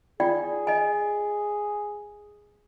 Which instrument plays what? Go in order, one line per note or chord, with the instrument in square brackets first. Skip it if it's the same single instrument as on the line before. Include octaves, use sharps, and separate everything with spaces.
[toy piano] F4 D5 G5 [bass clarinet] G#4
[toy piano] D#5 G#5